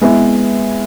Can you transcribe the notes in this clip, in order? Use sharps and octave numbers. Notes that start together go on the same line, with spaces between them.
G#3 B3 E4 B4